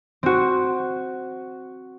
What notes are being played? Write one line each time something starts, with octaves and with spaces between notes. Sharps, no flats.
C4 F#4